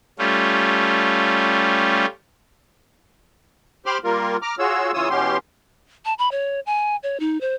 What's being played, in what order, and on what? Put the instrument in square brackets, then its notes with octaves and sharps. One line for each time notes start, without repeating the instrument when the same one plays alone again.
[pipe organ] G3 A3 C#4 F4
[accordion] G4 C5 B5 C6 D6 F6
G3 A#3 F4 A#4
A#5 D6 F6
F4 F#4 G#4 C#5 E6
C#3 E3 F4 C#5 D#6 E6
B2 E3 B3 C#4 G4 C6
[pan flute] A5
B5
C#5
G#5
C#5
D#4
C5